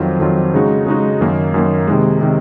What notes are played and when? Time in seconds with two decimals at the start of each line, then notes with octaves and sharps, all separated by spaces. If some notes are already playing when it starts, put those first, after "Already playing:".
Already playing: F2 D#3 F#3 C4 F4
0.20 F2 D#3 F#3 C4 F4
0.54 C#3 G#3 D#4 F#4
0.86 C#3 G#3 D#4 F#4
1.21 F#2 D#3 A#3
1.54 F#2 D#3 A#3
1.87 C3 D#3 G#3
2.21 C3 D#3